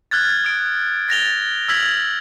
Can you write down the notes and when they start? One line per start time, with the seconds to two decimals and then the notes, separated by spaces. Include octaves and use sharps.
0.11 F6 F#6 G#6 A6
0.44 D#6 D7
1.08 A6 A#6 F7 G7
1.68 E6 F6 G#6 B6 F#7